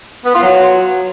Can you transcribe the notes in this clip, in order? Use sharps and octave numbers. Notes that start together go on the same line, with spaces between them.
B3
F4
F#3